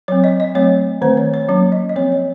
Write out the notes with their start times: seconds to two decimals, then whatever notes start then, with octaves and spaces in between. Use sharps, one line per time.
0.08 F#3 C4 C#5
0.24 D#5
0.40 D#5
0.55 F#3 A3 C4 C#5
1.02 D#3 A3 C4 C5
1.17 C#5
1.34 C#5
1.49 F#3 A#3 C#4 C#5
1.72 D#5
1.89 D#5
1.96 F3 C4 C#5
2.12 C#5